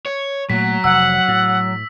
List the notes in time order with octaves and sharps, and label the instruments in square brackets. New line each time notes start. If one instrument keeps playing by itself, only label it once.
[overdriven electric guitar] C#5
[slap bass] A#2 A3 [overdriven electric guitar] F#3 [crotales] B6
[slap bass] F1 [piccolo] F#5 [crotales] E6
[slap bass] A2